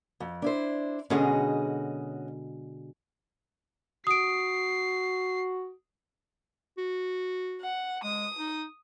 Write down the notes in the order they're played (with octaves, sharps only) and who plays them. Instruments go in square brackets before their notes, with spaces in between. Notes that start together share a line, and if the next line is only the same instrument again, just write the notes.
[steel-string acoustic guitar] F2
D4 E4 C5
[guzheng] B2 D3 G#3 [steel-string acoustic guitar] C#4 F#4 D#5
[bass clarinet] F#4 [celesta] D#6 D7 [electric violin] C7
[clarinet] F#4
[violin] F#5
[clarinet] G#3 [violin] D#6
[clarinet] D#4